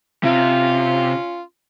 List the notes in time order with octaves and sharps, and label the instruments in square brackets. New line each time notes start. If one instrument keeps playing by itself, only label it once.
[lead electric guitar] C3 [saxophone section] C#4 F4